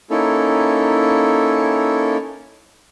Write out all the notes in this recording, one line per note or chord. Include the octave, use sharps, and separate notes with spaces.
A#3 C#4 D#4 E4 A4